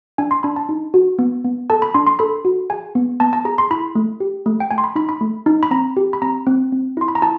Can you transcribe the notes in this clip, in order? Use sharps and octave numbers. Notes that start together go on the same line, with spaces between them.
D4 G#5
C6
D4 B5
A5
D#4
F#4
B3
B3
A4 A5
B5
D4 C6
C6
A4 B5
F#4
G#4 G#5
B3
B3 A5
A5
G#4 A#5
C6
E4 B5
A3
G4
A3
G5
A3 G#5
C6
B5
D#4 B5
B5
A3
D#4
B5
C4 A#5
G4
B5
C4 A#5
C4
C4
E4 C6
B5
A#5
E4 A5